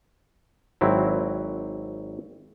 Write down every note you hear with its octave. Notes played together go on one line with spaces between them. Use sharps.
G#1 F#3 C4 E4